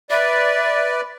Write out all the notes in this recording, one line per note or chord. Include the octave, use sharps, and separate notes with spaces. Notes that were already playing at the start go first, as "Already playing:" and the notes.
B4 D5 E5